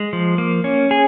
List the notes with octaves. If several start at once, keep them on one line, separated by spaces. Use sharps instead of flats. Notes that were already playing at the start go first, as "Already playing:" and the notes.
Already playing: G#3
F3
A#3
C#4
G#4